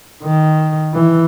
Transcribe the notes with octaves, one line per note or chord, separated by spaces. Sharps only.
D#3
E3